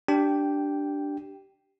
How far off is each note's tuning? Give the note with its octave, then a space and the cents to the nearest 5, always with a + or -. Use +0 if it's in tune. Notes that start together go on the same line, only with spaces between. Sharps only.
D4 -5 G4 -15 G5 +0